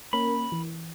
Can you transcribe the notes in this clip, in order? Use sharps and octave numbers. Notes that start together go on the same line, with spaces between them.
A#3 C#4 A#4 B5
E3